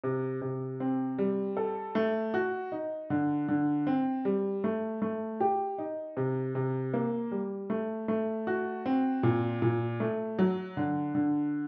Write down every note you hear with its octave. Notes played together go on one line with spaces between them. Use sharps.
C3
C3
C4
G3
A4
A3
F#4
D#4
D3
D3
C4
G3
A3
A3
G4
D#4
C3
C3
A#3
G3
A3
A3
F#4
C4
A#2
A#2
A3
F#3
D3
D3